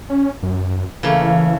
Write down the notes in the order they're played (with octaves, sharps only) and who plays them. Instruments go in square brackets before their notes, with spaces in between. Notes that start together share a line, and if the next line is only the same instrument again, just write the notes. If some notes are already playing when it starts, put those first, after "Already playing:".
[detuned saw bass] C#4
F#2
[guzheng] C#3 A3 A#3 [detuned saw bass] E3